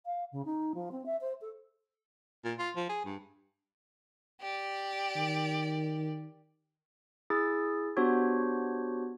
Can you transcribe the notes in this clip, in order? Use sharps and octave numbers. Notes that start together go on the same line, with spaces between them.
F5
C#3
D#4
F3
C4
E5
C5
A4
A#2
F4
F3
G#4
G2
G4 D5
D#3
E4 G#4 E6 A6
B3 D4 F#4 G4 C5 C#5